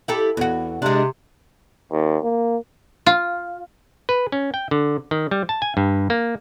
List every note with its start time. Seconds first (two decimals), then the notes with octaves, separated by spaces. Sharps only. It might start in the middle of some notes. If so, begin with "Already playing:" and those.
0.08 E4 G4 A4
0.37 E2 F#4
0.82 C3 G#3 D4
1.91 D#2
2.23 A#3
3.06 F4
4.09 B4
4.32 C#4
4.54 G5
4.71 D3
5.11 D#3
5.31 G3
5.49 A5
5.62 G#5
5.77 G2
6.10 A#3